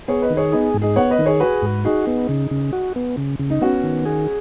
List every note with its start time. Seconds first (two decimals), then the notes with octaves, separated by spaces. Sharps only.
0.08 B3 G#4 C#5
0.22 B4 D#5
0.30 D#3
0.37 G#4 C#5
0.52 B3 D#4 G#4
0.74 G#2
0.82 D#4 G#4
0.96 B3 C#5 F#5
1.10 B4 D#5
1.19 D#3
1.26 G#4 C#5
1.40 F#4 G#4 B4
1.62 G#2
1.85 D#4 F#4 G#4
2.07 B3
2.29 C#3
2.51 C#3
2.73 F#4
2.96 B3
3.17 C#3
3.39 C#3
3.50 D#4
3.61 B3 C#4 F#4
3.83 D#3
4.06 G#4